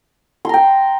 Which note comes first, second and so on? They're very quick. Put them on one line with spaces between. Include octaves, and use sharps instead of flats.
C6 A#5 G5